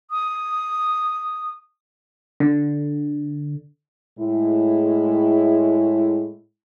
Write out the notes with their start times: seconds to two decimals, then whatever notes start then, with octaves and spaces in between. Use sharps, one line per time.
0.11 D#6
2.40 D3
4.19 A2 G#3 E4